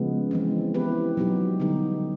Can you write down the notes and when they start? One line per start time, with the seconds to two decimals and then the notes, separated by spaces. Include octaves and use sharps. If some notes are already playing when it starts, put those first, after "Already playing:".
Already playing: C#3 F3 G#3 B3
0.31 E3 G#3 C4
0.74 B3 E4 G4 B4
1.17 B2 F#3 B3 D#4 G4
1.60 D3 G3 B3 D#4 G4